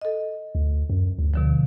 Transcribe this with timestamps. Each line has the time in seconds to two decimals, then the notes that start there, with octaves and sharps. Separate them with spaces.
0.01 A4 D#5
0.55 D2
0.90 F#2
1.19 D2
1.34 B2 D3 F3